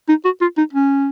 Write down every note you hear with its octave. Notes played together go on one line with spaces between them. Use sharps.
D#4
F#4
F4
D#4
C#4